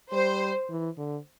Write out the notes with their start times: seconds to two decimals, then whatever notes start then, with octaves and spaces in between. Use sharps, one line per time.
0.12 G3 C5
0.69 E3
0.97 D3